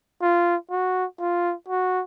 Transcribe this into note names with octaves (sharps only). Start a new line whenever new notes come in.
F4
F#4
F4
F#4